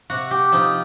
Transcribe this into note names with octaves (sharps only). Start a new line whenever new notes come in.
C3 F#4
G4
F3 D#4